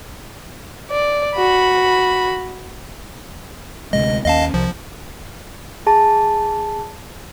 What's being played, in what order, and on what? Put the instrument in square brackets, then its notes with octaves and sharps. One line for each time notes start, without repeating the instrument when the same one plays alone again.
[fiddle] D5
F#4 B5
[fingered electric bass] D2 C3 G#3 [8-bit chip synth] D#5
[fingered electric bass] D#2 G#3 C#4 [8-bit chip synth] D#5 F5 A5
[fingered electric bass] C2 [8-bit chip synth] F3
[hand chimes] G#4 A5